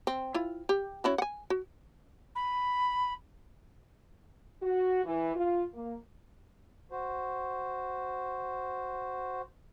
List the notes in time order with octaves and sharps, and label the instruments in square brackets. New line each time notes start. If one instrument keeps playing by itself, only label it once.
[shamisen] C4
E4 F4
G4
C#4 E4 F#4
F#5 G#5
F#4
[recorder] B5
[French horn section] F#4
E3
F4
A#3
[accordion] F#4 C5